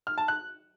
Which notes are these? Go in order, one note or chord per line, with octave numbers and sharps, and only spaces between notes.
F6
A5
F#6